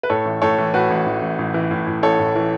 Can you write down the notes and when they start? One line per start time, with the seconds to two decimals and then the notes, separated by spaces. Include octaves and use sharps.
0.03 B4
0.10 A2 A4 C#5
0.25 A1
0.42 A2 A4 C#5
0.58 E3
0.74 A2 F#4 B4
0.90 A1
1.06 A1
1.22 A1
1.38 A1
1.54 E3
1.71 A2
1.87 A2
2.02 A1 A4 C#5
2.19 A2
2.35 E3